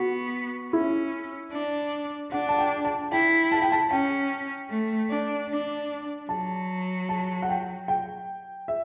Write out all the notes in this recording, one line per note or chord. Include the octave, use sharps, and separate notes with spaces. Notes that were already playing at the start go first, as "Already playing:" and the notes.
Already playing: B3 F#4
C#4 E4
D4
D4 F#5
A5
G5
A5
E4 G5
A5
G5
A5
C#4 G5
A3
D4
D4
F#3 A5
A5
F#5
G5
G5
E5